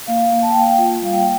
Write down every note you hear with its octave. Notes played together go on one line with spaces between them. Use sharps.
A#3 F5
A#3
A5
G5
A#3 F5
G5
F4
G3 F5
G5